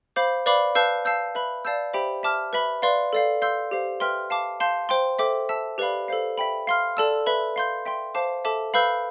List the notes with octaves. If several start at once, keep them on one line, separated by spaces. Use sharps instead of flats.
C5 F5 B5 D6 G6
B4 D5 F5 B5 D6
B4 F5 A5 E6 G6
F5 A5 E6 G6
B4 E5 B5
D5 F5 A5 E6 G6
G4 C5 E5 G5 B5
E5 A5 D6 F6
B4 E5 B5
B4 D5 F5 C6
A4 D5 F5
F5 C6 E6 G6
G4 C5 F5
B4 E5 G5 C6 F6
F5 A5 D6
F5 A5 C6 G6
C5 G5 C6
A4 C5 E5 G5 D6
E5 A5 E6
G4 B4 D5 F5 B5
A4 C5 F5
E5 G5 B5
F5 C6 F6
A4 D5 A5 E6
B4 E5 B5
F5 C6 G6
E5 G5 C6
C5 F5 A5 D6
A4 E5 A5 D6
B4 F5 B5 E6 G6